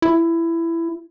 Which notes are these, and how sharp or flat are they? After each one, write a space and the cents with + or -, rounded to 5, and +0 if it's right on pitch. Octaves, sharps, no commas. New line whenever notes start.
E4 +15